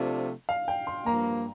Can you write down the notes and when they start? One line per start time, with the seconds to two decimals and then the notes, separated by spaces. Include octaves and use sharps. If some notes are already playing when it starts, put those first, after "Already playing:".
Already playing: C3 F3 A3 D4 F4
0.49 F5
0.68 G5
0.87 C6
1.06 G2 F3 A#3 A#5